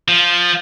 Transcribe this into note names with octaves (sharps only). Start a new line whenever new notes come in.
F3